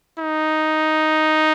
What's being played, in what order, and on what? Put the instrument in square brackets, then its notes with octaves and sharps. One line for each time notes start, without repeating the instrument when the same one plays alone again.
[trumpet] D#4